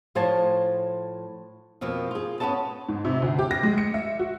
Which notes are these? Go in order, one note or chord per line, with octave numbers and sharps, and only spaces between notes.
A2 F3 C5 C#5 G#5 A5
F2 B2 F3 A#3
F4 G#4
B3 C#4 C#5 D#5 A5
G#2
C3
D2
G4
A#6
G#3
C#7
E5
F#4